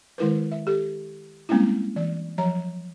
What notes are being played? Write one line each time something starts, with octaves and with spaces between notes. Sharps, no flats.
D#3 G#3 E4 A#4 B4
E5
G4 A4
G3 G#3 A#3 C4 C#4 E4
E3 D5
F3 F#3 C#5 A#5